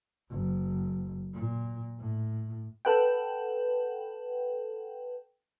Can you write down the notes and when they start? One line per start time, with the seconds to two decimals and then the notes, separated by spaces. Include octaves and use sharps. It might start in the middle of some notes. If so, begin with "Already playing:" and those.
0.30 F#1
1.33 A#2
1.99 A2
2.85 A4 B4 F#5 G5